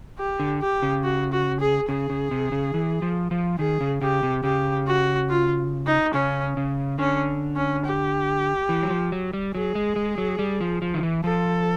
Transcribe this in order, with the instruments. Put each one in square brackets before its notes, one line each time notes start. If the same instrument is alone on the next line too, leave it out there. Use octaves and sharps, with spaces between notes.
[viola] G4
[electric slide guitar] D3
[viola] G4
[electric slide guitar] C#3
[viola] F#4
F#4
G#4
[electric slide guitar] C#3 [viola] G#4
[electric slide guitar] C#3
C3
C#3
E3
F3
F3
[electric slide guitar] D#3 [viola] G#4
[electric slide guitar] C#3
[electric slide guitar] C#3 [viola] G4
[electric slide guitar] C3
[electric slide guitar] C#3 [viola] G4
[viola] F#4
F4
D#4
[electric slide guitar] C#3 [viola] C#4
[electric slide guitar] C#3
[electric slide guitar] D3 [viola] C#4
[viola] C#4
G4
[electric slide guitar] E3
F#3
F3
F#3
G3
[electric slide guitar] F#3 [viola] G#4
[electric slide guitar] G#3
G#3
F#3
G3
F3
F3
D#3
E3
[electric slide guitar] F3 [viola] A4